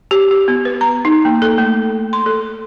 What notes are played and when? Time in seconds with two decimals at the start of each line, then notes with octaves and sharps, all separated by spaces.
0.11 G4
0.31 G4
0.48 B3
0.65 B4
0.81 A#5
1.05 D#4
1.25 A#3
1.42 A4
1.58 A3
2.13 C6
2.26 A4